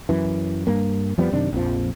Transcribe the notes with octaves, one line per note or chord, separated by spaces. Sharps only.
F#2 E3
G2 A#3
F2 F3 G3 B3
F#2 C3 D#3 D4
A#1 F2 F3